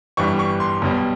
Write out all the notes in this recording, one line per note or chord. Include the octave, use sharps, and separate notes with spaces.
G1 G2 E3 G3 C#6
C#6
C6
B1 B2 G3